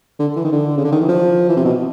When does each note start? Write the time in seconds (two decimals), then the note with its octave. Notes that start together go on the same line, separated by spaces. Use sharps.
0.19 D3
0.36 E3
0.44 D#3
0.52 D3
0.78 C#3
0.84 D3
0.92 D#3
1.00 E3
1.08 F3
1.49 E3
1.57 C3
1.65 B2